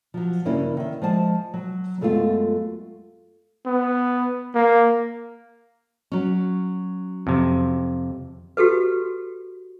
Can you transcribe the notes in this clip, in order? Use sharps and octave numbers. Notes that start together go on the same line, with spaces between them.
F3 F#3
G2 C#3 A#3 C#4 E4
D#3 E5
F3 G#3 A5
F#3
F#2 G#3 A3 B3 F4
B3
A#3
F#3 C#4
F2 C3
F#4 G4 A4 B4